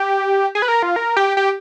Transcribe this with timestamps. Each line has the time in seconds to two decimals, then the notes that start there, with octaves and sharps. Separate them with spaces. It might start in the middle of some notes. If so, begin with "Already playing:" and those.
Already playing: G4
0.55 G#4
0.62 B4
0.68 A#4
0.83 F4
0.96 A#4
1.16 G4
1.37 G4